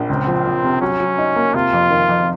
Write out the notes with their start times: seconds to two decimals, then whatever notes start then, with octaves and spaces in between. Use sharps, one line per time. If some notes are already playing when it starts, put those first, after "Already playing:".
Already playing: A#1
0.09 C#2 C4
0.27 F3
0.46 F3
0.64 C3
0.81 F#3 C#4
1.00 F#3
1.18 D#4
1.36 A#3
1.54 C3 F4
1.73 F2
1.91 D#3
2.09 F2